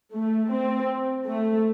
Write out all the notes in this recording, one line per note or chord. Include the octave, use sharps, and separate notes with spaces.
A3
C4
A3